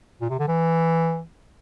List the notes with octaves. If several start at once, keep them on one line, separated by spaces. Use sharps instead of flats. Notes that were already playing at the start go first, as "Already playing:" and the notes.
A#2
C3
D3
E3